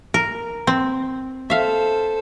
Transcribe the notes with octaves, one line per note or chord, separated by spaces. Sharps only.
A#4
C4
A4 C5 E5 F5